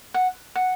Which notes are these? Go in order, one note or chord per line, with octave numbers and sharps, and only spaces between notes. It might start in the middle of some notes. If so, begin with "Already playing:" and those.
F#5
F#5